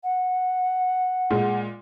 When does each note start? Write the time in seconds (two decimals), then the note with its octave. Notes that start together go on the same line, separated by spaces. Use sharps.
0.03 F#5
1.31 A#2 G#3